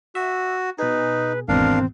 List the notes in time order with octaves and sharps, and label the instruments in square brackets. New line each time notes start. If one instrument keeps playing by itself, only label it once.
[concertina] F#4 [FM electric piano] E5
[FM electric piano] B2 G#4 [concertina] D#4 [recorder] B4
[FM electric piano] G#1 E2 B2 [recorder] C4 [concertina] D4 A#4 F5